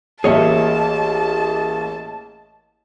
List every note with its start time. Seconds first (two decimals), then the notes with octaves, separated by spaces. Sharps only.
0.24 A1 A#3 G#4 C#5 D#5 E5 A5